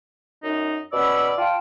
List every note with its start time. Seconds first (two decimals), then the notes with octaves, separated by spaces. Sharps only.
0.43 F#2 D#4
0.93 B2 C#4 D5 B5 E6
1.37 F4 G5 A5